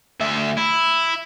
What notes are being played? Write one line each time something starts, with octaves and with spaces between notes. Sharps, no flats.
D2 E5
E4